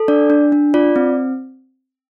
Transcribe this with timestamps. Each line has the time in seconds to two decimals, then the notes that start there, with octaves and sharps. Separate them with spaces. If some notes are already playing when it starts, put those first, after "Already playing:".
Already playing: A4
0.08 D4 D5
0.30 D4
0.52 D4
0.74 F4 D5
0.96 C4